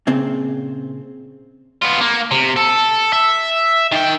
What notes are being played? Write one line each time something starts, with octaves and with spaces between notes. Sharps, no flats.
A#2 C#3 C4
B3 F4
A#3
C3
A4
E5
D#3 G5